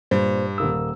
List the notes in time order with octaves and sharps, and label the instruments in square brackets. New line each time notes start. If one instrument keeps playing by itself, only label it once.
[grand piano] G2 [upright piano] A#2 [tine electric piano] C5
[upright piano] D#1 A#3 D#6 [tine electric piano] E6